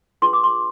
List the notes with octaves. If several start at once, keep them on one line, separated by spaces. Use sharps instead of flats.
D4 F4 G#4 B4 C6
D6
C6